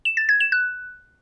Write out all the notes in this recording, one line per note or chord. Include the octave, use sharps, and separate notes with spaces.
E7
A6
G#6
E7
F#6